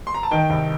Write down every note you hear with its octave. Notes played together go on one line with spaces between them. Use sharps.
C6
A#5
A5
D#3 G5
C2